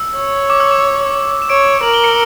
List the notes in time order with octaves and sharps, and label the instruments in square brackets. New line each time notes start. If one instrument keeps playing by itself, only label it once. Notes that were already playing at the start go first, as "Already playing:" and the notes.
Already playing: [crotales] E6
[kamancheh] C#5
[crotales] D6
E6
D6
E7
[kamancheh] C#5 [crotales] D7
[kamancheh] A#4 [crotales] F#7
[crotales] G7
C#7